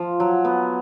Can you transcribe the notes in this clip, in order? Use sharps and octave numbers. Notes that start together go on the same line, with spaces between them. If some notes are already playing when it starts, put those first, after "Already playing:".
Already playing: F3
F#3
B3